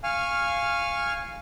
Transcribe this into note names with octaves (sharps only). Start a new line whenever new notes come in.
F5 G#5 C#6 F6